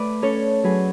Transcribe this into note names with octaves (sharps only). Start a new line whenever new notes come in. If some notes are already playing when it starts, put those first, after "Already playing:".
Already playing: A3 B4 D5
C#4 A4 C#5
F#3 G#4 B4